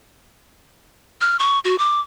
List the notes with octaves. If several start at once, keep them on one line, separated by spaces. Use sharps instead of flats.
F6
C#6
F#4
D6